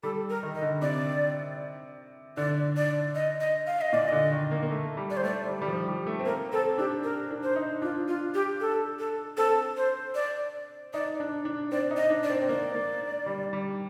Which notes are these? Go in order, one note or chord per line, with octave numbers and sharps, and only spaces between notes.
G3 A4
A#4
D#3
D#5
D3
C3 D5
D3 D5
D5
D#5
D#5
F5
D#5
A#2 D5
D3 D#5
D#3
A#3
A#3
A3
G3
D5
C5
A3 D5
G3
G3
F3
G3
A3
C4
A#3 A#4
C4 A4
D4 G4
A#4
D4
C5
D#4
D4 F4
F4
G4
A4
A4
C4 A4
C5
D5
D#4 D5
D4
D4
C4 D5
D#4
D#5
D4
D5
C4
C4
A#3 D5
A#3
G3
G3